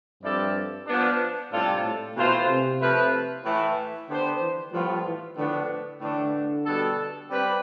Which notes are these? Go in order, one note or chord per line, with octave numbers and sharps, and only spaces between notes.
G2 F3 C4 E4 A4 D5
F3 B3 D4
A2 C3 G3 D4 F4 A4
A2
B2 E3 A3 C4 F4 C5
C3
F3 A3 E4 B4
A2 E3 A3
D3 B3 D4 G4 C5
E3
A2 F3 G3 B3 F4
E3
A2 D3 F3 B3 D4
A2 D3 E3 A3 D4
B2 G3 D4 A4
G3 C4 G4 B4